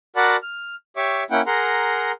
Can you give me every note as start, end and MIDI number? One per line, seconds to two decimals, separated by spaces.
0.16 0.37 66
0.16 0.37 70
0.16 0.37 74
0.16 0.37 78
0.16 0.37 81
0.16 0.37 83
0.43 0.75 89
0.97 1.23 67
0.97 1.23 73
0.97 1.23 76
0.97 1.23 85
0.97 1.23 86
1.31 1.41 58
1.31 1.41 61
1.31 1.41 64
1.31 1.41 78
1.31 1.41 79
1.47 2.12 68
1.47 2.12 70
1.47 2.12 78
1.47 2.12 82
1.47 2.12 84